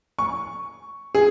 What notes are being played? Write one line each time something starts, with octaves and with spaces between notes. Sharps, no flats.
C#6
G#4